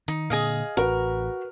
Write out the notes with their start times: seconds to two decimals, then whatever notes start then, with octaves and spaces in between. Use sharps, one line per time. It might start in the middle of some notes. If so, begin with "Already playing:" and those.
0.08 D#3 D#4
0.30 A#2 D3 G#4 D#5 F5
0.77 A1 F#4 A#4 B4